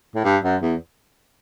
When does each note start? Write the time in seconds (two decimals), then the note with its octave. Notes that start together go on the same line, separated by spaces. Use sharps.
0.15 A2
0.24 G2
0.43 F#2
0.62 E2